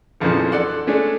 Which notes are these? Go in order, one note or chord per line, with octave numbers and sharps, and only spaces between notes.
B1 F2 A#2 C#3 E3 F3
A4 D5 F#5 C6
G#3 A3 C#4 D4